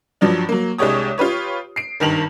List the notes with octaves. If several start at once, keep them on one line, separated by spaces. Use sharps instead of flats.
G2 F3 F#3 D4
F#3 A#3
C2 G#3 D4 G4 C#5 D#6
F4 G4 B4 C#5
C7 D7
G#1 G2 D#3 F7 F#7